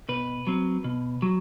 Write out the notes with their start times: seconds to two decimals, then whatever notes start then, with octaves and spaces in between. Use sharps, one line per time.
0.09 B2 B4
0.47 F#3 C4
0.84 B2
1.22 F#3